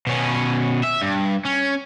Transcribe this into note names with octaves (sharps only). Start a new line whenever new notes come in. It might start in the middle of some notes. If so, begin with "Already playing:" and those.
B2 C#4
E5
G2
C#4